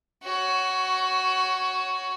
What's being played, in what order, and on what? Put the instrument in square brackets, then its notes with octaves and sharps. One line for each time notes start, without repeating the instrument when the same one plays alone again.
[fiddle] F#4 C#5